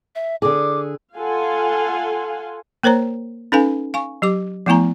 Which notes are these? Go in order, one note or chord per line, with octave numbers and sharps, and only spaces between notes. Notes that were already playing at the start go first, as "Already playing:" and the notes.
E5
D3 G#4 D6
F4 A4 F5 F#5 G#5 C6
A#3 A#4 C5 C#5 A#5
C#4 D#4 A4 B4 F5 G#5
F5 G#5 C#6
F#3 G4 D6
F3 A3 B3 E4 G#5 A#5